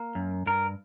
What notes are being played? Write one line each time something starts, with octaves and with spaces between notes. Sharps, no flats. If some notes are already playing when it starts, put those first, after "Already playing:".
Already playing: A#3
F#2
G2 A#4